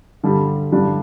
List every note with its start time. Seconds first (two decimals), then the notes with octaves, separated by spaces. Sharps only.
0.23 G2 D3 G3
0.72 G2 D3 G3 D4